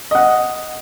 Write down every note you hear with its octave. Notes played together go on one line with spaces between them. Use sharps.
D#5 F#5